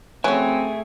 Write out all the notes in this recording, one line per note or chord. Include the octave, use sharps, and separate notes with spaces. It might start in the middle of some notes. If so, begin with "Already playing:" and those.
F#3 A3 C4 C#4 G#4 E5 G#5